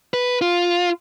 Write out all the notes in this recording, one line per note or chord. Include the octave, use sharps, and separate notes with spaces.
B4
F4